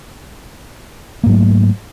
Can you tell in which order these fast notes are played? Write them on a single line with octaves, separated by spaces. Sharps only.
A#3 G#2 F#3 A3